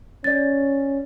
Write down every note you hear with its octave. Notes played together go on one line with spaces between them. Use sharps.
C#4 D5 A6